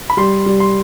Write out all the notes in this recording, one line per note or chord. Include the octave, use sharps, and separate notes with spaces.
B5
G3 C6
G3
C6